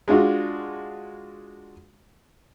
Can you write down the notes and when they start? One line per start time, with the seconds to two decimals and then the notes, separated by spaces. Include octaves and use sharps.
0.08 G#3 D4 F4 F#4